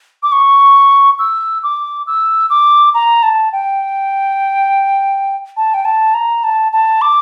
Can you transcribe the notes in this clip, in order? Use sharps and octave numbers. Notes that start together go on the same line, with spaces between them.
D6
C#6
E6
D6
E6
D6
A#5
A5
G5
A5
G5
A5
A#5
A5
A5
D6